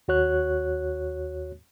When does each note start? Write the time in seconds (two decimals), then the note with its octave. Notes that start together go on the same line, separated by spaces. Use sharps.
0.08 D#2 F#4 C#5 F#6